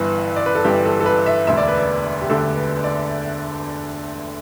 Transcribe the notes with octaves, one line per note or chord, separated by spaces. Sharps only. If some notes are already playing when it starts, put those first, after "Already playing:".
Already playing: G1 G2 E3 B4
D5
B4
A4
G1 G2 E3 G4
A4
A4
B4
E5
E1 D2 D3 E5
D5
B4
D5
G4
E1 D2 D3 A4
B4
D5